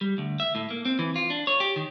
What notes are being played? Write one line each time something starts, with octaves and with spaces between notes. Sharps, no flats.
G3
D2
E5
A2
A#3
C4
E3
F4
D4
C#5
G4
D#3